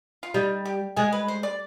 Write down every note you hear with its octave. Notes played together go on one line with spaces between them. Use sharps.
F4
G3 D#4
G4
G#3 G#4
B4
C5
D5